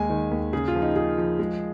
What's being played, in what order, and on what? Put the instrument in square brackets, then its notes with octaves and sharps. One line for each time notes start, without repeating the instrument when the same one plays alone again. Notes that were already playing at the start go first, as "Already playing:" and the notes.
Already playing: [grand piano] D#2 G#3 G#5
D#3
D#2
C#3 G#4
F4
F3
D#4
F3 G#4
F3
G#3